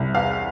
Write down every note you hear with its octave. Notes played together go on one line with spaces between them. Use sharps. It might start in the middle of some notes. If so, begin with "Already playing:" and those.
Already playing: C2
E2 F5